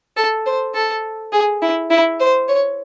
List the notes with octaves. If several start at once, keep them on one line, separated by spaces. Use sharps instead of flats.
A4
C5
A4
G#4
E4
E4
C5
C#5